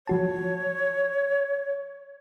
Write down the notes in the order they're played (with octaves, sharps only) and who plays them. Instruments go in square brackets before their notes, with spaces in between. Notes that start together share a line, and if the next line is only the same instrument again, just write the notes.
[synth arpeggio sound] F3 F#4 A5 [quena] C#5